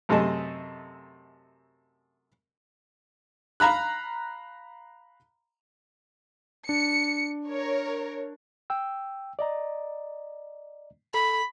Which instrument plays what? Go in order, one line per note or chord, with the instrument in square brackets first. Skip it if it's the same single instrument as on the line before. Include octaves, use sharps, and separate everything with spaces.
[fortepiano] F#2 C3 A3 G#4 D#5 A5
F5 A#5 B5 F#6
[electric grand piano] D4 [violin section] C#7
[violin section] A#4 C#5
[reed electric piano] G5 E6
D5 D#5 A#5
[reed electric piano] A4 [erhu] B5